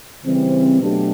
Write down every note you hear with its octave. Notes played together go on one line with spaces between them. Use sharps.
C#3 E3 G3 C4
B2 F#3 A3 D4 G4